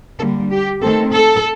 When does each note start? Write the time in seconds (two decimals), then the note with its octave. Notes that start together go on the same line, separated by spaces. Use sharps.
0.19 D3 G3 A#3 A4
0.50 G4
0.81 D#3 A3 C4 A4
1.13 A4